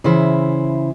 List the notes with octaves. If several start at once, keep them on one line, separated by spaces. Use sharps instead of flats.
C#3 E3 E4 C5